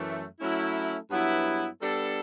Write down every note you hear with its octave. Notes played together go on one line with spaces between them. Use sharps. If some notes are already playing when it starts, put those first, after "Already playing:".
Already playing: F#2 E3 A3
F#3 A3 C#4 E4
G2 F#3 B3 E4
G3 B3 D4 A4